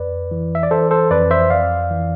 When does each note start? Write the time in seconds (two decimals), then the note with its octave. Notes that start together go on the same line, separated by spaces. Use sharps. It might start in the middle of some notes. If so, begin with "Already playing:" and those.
Already playing: F2 B4 D5
0.31 E3
0.55 E5
0.63 D5
0.71 E3 A4 C5
0.91 A4 C5
1.11 F2 B4 D5
1.31 C5 E5
1.50 F2 D5 F5
1.91 E3